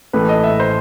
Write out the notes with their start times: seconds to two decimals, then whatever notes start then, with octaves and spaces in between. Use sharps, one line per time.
0.13 A1 A2 E3 A3 B4
0.29 D#5
0.43 E5
0.60 C5